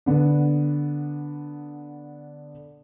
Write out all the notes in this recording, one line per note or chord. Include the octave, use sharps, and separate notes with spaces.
D3 B3 D4